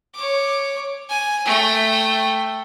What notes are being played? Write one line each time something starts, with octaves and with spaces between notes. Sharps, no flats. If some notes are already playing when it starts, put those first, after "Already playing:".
C#5 D6
G#5
A3 G5